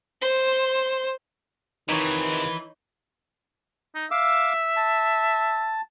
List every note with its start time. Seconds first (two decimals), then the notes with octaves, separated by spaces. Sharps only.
0.21 C5
1.89 F2 C3 D#3 E3 D#4 C#5
3.95 D#4
4.11 E5 F5 D6 E6
4.76 A5